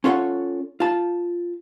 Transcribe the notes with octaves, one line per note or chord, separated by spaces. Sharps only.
C#4 F4 A4 C#5 F#5
F4 A5